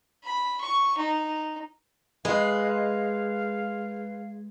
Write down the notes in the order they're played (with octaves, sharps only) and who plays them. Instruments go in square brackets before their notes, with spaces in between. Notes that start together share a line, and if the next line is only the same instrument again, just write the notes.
[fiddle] B5
C#6
D#4
[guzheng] G#3 [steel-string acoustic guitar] B4 [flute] F5